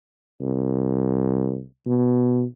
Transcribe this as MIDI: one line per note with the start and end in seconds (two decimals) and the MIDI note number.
0.40 1.62 36
1.87 2.44 47